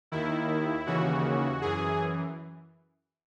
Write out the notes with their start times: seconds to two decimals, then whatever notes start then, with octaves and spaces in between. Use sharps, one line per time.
0.12 D#2 D#3 E4
0.86 D#2 C#3 E3 F#4
1.61 F#2 E3 G#4